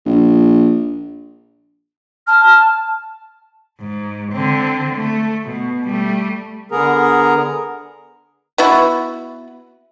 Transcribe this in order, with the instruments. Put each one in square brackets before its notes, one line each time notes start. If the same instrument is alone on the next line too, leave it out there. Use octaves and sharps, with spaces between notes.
[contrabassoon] A#1
[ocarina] A5 [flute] F6
[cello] G#2
D3 C4
A3
B2
G3 A3
[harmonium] D3 B3 G#4 A#4 A#5
[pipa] B3 E4 F#4